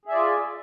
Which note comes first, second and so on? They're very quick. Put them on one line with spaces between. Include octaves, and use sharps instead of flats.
G#4 E5 D5 F4